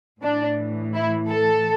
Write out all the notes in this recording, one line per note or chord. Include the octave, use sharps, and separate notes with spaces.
A2 E3 D4
E4
A4